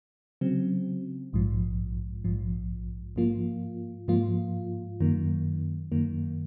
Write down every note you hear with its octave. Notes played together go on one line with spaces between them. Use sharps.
C#3 F#3 C4
A#1 G#2 F3
A#1 G#2 F3
G#2 F3 A#3 F4
G#2 F3 A#3 F4
F#2 D#3 A#3
F#2 D#3 A#3